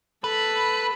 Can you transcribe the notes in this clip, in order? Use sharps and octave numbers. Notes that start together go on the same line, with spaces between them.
A4 B4 B5